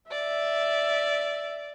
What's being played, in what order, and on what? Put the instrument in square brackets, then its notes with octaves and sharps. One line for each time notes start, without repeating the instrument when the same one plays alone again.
[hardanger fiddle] D5 [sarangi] E5